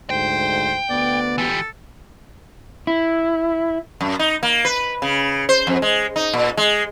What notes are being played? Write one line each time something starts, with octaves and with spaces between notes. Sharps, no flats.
D2 G#2 C5 G5
D2 B3 D5
E3 G4 A4
E4
F#2
D#4
A#3
B4
C#3
C5
F2
G#3
D#4
A#2
G#3